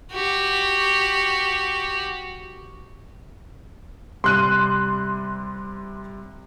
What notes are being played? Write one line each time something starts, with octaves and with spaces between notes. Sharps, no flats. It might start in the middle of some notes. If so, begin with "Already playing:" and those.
F#4 G4
C3 G3 C6 F#6 D#7